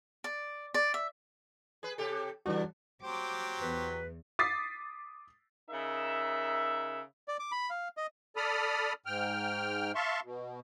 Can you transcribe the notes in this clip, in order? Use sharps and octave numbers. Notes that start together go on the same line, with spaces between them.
D5
D5
E5
G#4 B4
C3 G4 A4
C#3 E3 G3 D4 F#4
F#3 G4 C5 D6
E2 B4
D6 D#6 A6 B6 C7
C#3 D#4 A#4 E5
D5
D6
B5
F5
D#5
A4 D5 B5 D#6 F6
G#2 G5 F6
E5 F5 A5 C6 C#6
B2